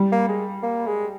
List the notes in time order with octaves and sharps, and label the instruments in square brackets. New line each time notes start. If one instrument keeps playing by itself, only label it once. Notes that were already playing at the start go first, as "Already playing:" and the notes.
Already playing: [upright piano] G3
[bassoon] A#3
G#3
A#3
G#3